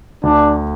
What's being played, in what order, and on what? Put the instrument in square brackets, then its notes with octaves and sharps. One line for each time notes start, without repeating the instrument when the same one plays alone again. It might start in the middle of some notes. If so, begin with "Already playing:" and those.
[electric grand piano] D2 [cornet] D4